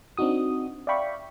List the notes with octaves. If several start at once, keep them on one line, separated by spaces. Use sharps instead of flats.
C4 D4 D#4 F#4 D#6
D5 E5 F5 G5 B5 C#6